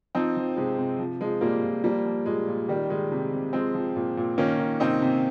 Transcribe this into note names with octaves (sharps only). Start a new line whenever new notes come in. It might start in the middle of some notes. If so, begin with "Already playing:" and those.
F3 C4 D#4
F3
C3 G#3
C3
F3
F3 G#3
A#2 G3 A#3
A#2
F3 G3 A#3
F3
A#2 G#3
A#2
D#3 G3
D#3 G#3
C3
C3
F3 G#3 C4
F3
A#2
A#2
D#3 A#3 C#4
D#3
C3 C4 D#4
C3